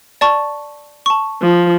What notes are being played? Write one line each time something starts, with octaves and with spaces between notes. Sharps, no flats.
D5 A5 C#6
A5 C#6
F3